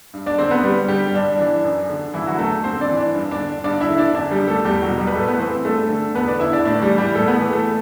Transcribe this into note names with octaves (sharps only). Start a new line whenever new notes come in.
G2
D4 D5
D3 C4 C5
B3 B4
G2 G3 G4
D3 G3 G4
G2 D4
E3 D4
F#2
D3
G2 E3 E4
F#3 F#4
D3 A3 A4
G2 C4 C5
D4 D5
E3
D4 D5
G2
D4 D5
D3
G2 D4 D5
E4 E5
D3
D4 D5
F#2 D4 D5
G3 G4
D3
A3 A4
E2 G3 G4
F#3 F#4
B2
G3 G4
B4
A2 A3 A4
B3 B4
E3 C4 C5
G2 A3 A4
D3
E2 B3 B4
D4 D5
D3 E4 E5
D4 D5
A2 D4 D5
G3 G4
E3
G3 G4
A2 A3 A4
B3 B4
E3
A3 A4